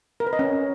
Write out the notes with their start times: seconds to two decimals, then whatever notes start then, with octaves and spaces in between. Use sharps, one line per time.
0.20 A#4
0.27 B4
0.33 D#5
0.39 C#4